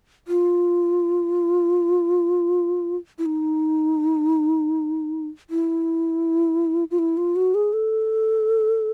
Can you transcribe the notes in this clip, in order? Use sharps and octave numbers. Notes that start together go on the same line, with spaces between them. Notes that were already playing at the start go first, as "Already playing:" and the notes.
F4
E4
D#4
E4
F4
E4
F4
F#4
G#4
A4